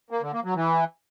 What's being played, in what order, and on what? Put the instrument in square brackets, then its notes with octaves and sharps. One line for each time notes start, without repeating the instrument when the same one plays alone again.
[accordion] A#3
D3
A#3
F#3
E3